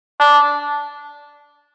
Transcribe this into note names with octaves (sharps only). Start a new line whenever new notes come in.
D4